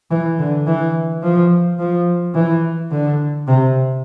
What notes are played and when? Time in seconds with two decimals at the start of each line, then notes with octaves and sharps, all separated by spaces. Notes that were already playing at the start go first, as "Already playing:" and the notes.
0.11 E3
0.39 D3
0.67 E3
1.23 F3
1.79 F3
2.35 E3
2.91 D3
3.48 C3